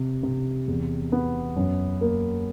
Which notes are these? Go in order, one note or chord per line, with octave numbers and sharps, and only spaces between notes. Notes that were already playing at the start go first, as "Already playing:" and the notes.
Already playing: C3
C3
E2
B3
F#2
A#3